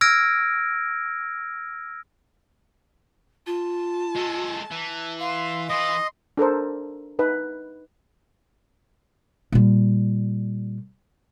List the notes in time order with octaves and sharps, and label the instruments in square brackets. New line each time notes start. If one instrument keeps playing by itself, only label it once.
[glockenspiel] E6 F6 G#6 A#6 D7
[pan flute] F4 [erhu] A5
[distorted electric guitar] G#3 A4
E3
[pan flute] F5 [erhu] C6
[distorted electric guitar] E3 B4 [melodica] D#5 [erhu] C6
[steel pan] D4 A4 A#4 C5
D#4 B4
[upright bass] A#2 G3